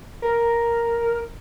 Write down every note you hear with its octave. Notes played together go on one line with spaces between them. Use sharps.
A#4